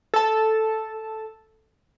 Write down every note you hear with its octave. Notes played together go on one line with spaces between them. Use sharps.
A4 A5